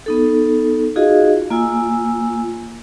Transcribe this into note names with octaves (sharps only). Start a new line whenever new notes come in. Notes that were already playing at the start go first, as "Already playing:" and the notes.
B3 D#4 A4
D#4 F4 F#4 G#4 D#5 F5
A#3 F4 G#5 E6